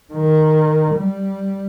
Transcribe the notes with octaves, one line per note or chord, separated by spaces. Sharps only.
D#3
G3